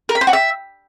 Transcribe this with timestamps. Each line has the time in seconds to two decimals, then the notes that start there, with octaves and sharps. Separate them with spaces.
0.09 A#4
0.15 B5
0.21 C5
0.27 F#4
0.33 E5